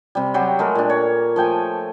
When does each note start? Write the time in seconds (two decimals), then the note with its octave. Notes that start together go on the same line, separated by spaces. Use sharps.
0.15 C3 G3
0.34 F#3 G3 G4
0.59 G#3 A3 A#4
0.75 A#2 D4
0.90 C#5
1.36 F3 A3 G5 G#5